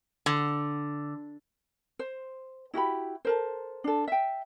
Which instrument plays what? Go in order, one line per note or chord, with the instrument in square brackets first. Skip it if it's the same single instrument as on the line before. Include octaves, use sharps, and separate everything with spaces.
[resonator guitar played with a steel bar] D3
[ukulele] C5
E4 F#4 G4 B5
A4 A#4 C5
D4 A4
E5 G5